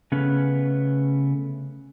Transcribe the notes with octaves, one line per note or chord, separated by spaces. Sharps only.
C#3 A3 B3 C#4 B4